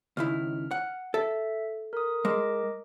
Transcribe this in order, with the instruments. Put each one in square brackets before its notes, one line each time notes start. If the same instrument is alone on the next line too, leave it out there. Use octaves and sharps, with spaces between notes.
[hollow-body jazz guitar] C#2 D#3 E4 [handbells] F6
[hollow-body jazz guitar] F#5
[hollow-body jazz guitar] A4 [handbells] E5
[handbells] A#4 D#6
[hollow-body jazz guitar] G#3 [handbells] A#4 D#5 D6